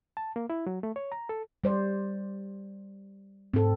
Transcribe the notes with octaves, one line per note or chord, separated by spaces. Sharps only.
A5
A#3
E4
F#3
A3
C#5
A#5
A4
G3 C5 D5
G#2 C4 A4